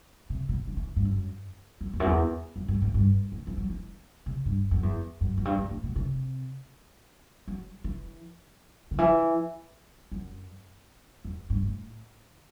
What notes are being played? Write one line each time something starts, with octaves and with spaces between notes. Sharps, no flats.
C3
B2
D3
E3
G2
F#2
F#2
E2
F#2
E2
F#2
G2
A2
G2
A2
E3
F#3
E3
C3
G2
F#2
E2
F#2
F#2
G2
G2
A2
B2
C3
F#3
E3
D3
E3
F#2
E2
G2
A2